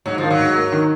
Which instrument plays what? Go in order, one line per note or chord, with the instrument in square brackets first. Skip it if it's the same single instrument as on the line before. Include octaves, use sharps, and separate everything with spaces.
[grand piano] G#2 [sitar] F#3
[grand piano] D#3 [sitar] F3
[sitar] F#3
[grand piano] G#2
A#3
D#3